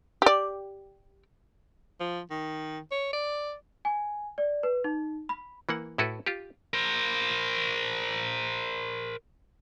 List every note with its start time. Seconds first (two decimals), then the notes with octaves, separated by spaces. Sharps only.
0.22 G4 D5
2.00 F3
2.30 D#3
2.91 C#5
3.13 D5
3.85 G#5
4.38 D5
4.63 B4
4.84 D#4
5.29 B5
5.69 E3 A#3 F#5
5.98 A2 E4 F#4 A4 B4
6.26 F4 G4
6.74 A#4 C5